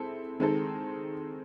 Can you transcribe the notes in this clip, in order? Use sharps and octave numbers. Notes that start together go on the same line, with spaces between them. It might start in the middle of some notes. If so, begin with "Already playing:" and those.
Already playing: G#3 C4 E4 A4
D#3 G#3 C4 D#4 A4